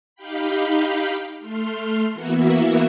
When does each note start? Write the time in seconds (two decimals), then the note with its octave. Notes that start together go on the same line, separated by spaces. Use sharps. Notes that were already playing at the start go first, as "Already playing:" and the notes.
0.15 D#4 G4 F5 G5 B5
1.40 A3 C6 F6
2.13 E3 A#3 B3 F#4 E5